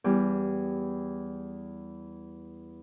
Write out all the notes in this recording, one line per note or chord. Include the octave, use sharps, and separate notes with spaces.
E2 G3